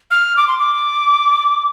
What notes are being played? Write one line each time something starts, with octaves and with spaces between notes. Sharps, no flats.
F6
D6
C6
D6